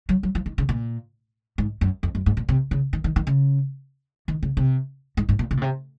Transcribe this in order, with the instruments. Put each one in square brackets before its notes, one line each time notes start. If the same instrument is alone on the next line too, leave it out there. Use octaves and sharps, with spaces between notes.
[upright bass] F#3
F#3
F3
D#3
C#3
A#2
G#2
F#2
F2
F#2
G#2
A#2
C3
C#3
D#3
D#3
D#3
C#3
D#3
C#3
C3
G#2
G#2
A#2
C3
A#2
C3